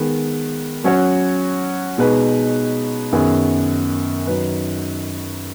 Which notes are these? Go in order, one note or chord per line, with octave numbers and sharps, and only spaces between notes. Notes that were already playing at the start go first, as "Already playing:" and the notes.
Already playing: D#3 G#3 B3
F#3 C#4 F#4 C#5
B2 G#3 D#4 B4
F#2 D#3 B3 G#4
F#2 D#3 F#3 D#4 B4